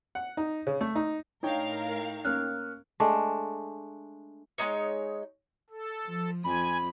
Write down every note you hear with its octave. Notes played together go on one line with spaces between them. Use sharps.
F#5
D#4
C#3
A3
D#4
A2 D4 D#4 A#4 C#5 F5 G5
A#3 C#4 F6 F#6
G#3 A3 D4
G#3 C#4 D#4 C#5
A4
F3
F2 G#5 B5